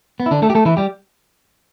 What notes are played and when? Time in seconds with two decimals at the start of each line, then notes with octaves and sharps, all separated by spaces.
0.20 B3
0.26 E4
0.31 D3 D4
0.42 A3 A4
0.50 G4
0.55 A3 A4
0.65 E3 E4
0.77 G3 G4